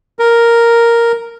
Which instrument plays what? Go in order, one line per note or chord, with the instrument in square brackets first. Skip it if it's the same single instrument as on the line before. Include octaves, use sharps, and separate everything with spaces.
[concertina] A#4